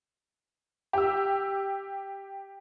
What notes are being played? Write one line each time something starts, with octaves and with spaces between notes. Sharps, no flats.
G4 E6